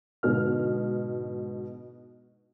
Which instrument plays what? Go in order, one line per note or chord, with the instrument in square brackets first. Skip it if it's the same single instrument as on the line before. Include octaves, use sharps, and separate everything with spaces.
[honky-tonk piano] G#2 B2 D3 F6